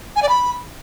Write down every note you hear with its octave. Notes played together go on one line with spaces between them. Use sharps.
G#5
D5
B5